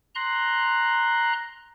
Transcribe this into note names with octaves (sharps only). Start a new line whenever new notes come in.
A#5 C6 F#6